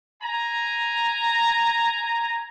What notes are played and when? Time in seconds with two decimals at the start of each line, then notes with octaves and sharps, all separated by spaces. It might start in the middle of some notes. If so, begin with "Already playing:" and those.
0.22 G#5 A#5